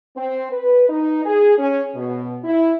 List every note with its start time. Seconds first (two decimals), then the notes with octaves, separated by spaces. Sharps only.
0.17 C4
0.52 B4
0.89 D#4
1.25 G#4
1.58 C#4
1.95 B2
2.44 E4